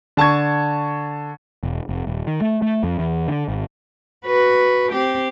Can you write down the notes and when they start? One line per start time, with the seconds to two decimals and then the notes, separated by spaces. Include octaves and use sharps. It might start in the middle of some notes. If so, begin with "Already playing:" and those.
0.17 D3 A5 C#6 G#6
1.63 E1
1.89 F1
2.07 D#1
2.27 D#3
2.41 A3
2.62 A3
2.83 F2
2.99 E2
3.28 D3
3.48 G#1
4.26 F#4 B4
4.92 C4 G4